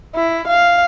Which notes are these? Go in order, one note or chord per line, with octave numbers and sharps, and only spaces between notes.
E4
F5